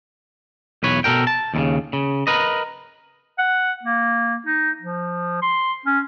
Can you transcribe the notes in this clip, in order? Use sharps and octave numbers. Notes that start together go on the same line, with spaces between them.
B1 E2 B4 C#5
B2 A4 A#4 G5
A5
D#2 A#2 C#3
C#3
A#4 B4 D#5
F#5
A#3
D#4
F3
C6
C#4